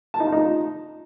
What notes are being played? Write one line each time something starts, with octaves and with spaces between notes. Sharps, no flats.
A5
D#4
F4
D#4